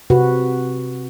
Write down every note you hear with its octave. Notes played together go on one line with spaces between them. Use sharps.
C3 F#4 B4